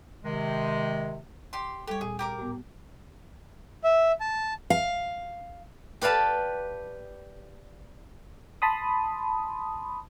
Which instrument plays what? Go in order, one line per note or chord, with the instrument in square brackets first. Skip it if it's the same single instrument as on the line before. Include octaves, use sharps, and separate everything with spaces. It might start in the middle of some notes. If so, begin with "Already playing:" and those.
[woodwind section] C3 D#3 G#3
[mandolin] G4 C6
[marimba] G3 A4 [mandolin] G4 C#5
[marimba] D2 A#2 [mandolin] G#4
[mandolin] G4 A#4 D6 [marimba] G5
[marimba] A2 B3
[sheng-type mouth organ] E5
A5
[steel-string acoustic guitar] F5
[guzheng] G4 B4 D5 F5 A5
[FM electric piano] A5 B5 C6 D#6